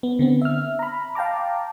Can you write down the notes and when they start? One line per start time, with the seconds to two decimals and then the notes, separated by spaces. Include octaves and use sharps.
0.03 B3
0.19 D3 B3 C4
0.42 E5 F6
0.79 A#5 B5
1.15 F5 G5 A5 A#5 D6